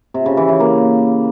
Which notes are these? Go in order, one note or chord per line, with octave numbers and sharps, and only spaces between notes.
C3
C#3
E3
E3
A#3